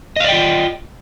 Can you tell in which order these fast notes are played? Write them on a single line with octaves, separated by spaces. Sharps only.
D#5 F5 D5 G5 F4